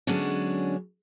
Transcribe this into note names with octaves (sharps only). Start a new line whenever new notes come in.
D3 F#3 G#3 B3 C#4 D4